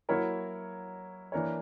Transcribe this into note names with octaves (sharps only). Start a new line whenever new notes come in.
F#3 A#3 E4 A#4 C#5
E3 A#3 D4 A#4 C#5